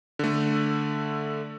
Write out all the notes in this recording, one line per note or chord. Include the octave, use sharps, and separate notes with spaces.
D3 A3